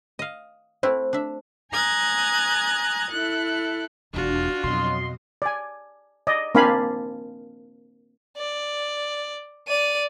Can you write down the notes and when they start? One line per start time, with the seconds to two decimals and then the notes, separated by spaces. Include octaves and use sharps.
0.19 D#5 F5
0.83 A3 C4 E4 C5
1.13 D4 E5
1.71 G#5 A#5 D#6 F#6 G#6 A6
3.09 E4 A4 F#6
4.14 E1 E2 D4 F4 F#4
4.64 F2 B2 F#3 D#5 C6
5.42 D5 G#5
6.27 D5 D#5
6.55 A#3 C4 D4 F5 G#5 B5
8.38 D5
9.68 D5 D#7